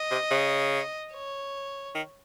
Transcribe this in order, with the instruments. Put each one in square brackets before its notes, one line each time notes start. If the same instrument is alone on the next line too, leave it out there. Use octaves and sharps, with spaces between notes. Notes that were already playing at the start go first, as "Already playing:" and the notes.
Already playing: [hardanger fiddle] D#5
[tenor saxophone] C3
C#3
[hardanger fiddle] C#5
[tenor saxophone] D#3